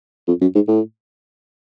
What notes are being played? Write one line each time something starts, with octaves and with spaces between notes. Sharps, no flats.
F2
F#2
G#2
A2